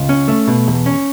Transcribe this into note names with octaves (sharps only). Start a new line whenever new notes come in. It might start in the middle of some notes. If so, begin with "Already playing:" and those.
Already playing: C#2
C#4
A3
B2
E2
C#4